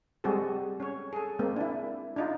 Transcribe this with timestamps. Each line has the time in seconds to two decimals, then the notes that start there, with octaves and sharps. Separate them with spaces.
0.24 G3 G#3 C4 F#4 G#4 A4
0.80 C#4 C#5
1.13 G#4 A4
1.39 G#3 A#3 C4
1.56 D4 E4
2.16 D4 D#4 F4